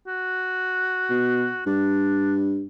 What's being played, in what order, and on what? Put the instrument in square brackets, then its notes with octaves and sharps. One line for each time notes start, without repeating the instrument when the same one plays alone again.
[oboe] F#4
[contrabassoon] B2
[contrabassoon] G2 [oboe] D4